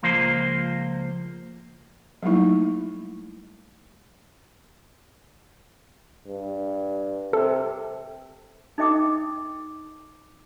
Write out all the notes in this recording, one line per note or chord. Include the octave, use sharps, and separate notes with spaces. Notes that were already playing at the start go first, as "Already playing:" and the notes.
C#2 F3 A#3 C5
F#3 G3 A3 A#3 D#4 E4
G2
C3 A4
D#4 A4 D#5 G5 D6 D#6